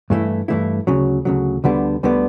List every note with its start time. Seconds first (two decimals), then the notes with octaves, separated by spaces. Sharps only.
0.10 G2 E3 A3 E4
0.48 G2 E3 A3 E4
0.87 D2 C#3 F#3
1.25 D2 C#3 F#3
1.64 D2 D3 G3 B3 D4
2.03 D2 D3 G3 B3 D4